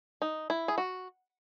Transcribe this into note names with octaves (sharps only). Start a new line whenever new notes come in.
D#4
E4
G#4
F#4